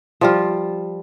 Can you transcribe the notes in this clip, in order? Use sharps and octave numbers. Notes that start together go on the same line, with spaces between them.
F3 G3 F4